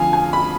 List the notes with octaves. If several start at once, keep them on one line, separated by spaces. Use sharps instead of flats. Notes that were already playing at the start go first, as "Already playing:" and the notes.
Already playing: F2 D3 F3 F5 G#5
G#5
B5